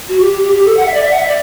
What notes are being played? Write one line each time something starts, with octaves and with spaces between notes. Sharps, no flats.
F#4
G4
G4
G4
G4
A4
F#5
E5
D5
E5
F#5
E5
D5